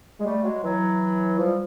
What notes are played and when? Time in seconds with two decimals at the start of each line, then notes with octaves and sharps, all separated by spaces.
0.20 G#3
0.25 G3 A3
0.44 F#3 G#3
0.63 E3 F#3
1.39 F3 G3